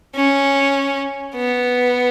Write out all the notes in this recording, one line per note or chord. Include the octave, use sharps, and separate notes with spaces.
C#4
B3